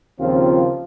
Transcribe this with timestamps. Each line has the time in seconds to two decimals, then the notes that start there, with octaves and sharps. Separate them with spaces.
0.19 D#2 C#3 F3 C4 F4